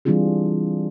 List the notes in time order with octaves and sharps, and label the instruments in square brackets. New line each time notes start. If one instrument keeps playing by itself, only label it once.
[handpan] E3 G3 C4 D4 F4 G#4